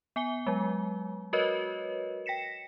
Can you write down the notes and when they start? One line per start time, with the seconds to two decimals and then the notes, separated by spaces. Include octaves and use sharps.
0.16 B3 G#5 G7
0.47 F#3 G#3
1.33 F#4 A#4 B4 C#5 D#5
2.26 G5 A#6 B6 C#7 E7